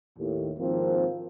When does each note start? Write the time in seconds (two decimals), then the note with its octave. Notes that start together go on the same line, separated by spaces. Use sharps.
0.18 D#2 A2
0.57 G#1 F3 A#3 C4